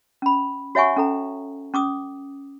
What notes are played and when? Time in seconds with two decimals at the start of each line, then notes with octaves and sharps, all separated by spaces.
0.22 C#4 B5
0.75 F#4 C#5 E5 F#5 G#5 C#6
0.96 C#4 A4 A#5
1.74 C#4 D6 D#6